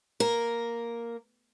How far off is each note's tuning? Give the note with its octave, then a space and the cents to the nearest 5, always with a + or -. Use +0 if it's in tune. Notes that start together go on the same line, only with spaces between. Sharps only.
A#3 +0 A#4 +0